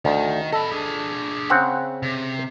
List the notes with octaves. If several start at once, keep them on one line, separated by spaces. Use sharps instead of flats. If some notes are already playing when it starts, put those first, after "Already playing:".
D2 D#3
A4 D#5 B5
D4 G#4
C#3 C4 F#5
C3